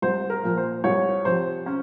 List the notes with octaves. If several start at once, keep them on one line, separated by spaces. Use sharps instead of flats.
C2 C5
A#4
A#2 F3
C5
C2 C#5
C3 F3 C5
C#4